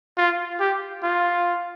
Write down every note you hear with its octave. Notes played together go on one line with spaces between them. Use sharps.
F4
G4
F4